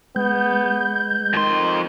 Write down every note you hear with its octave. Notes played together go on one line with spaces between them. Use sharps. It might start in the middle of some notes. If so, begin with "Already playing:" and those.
G#3 B3 G6
F2 D#3 C6